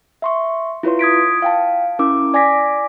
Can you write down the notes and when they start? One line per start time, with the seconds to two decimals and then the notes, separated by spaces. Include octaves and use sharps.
0.22 E5 C6 C#6
0.83 E4 F4 B4 C#5 C6
0.99 D#6 G#6 B6 D7
1.42 F5 G5 A5
1.99 C#4 E4 A#4 D6 E6
2.34 D5 G#5 D6 A#6 B6